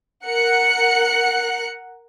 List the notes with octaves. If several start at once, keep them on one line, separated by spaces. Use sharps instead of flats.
A#4 F#5 F#6 C#7